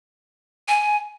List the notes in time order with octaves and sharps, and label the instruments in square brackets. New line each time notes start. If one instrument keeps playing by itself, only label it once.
[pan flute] G#5